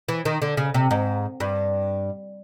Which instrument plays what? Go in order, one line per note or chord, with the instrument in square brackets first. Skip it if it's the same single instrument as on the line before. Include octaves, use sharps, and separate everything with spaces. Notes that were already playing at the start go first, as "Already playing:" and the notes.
[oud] E3
D#3
D3
C#3
C3
G#2
G2